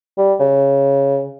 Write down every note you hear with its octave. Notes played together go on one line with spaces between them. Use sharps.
G3
C#3